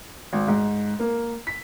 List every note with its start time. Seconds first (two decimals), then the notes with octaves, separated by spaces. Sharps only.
0.33 G#1
0.48 G#2
1.00 A#3
1.47 B6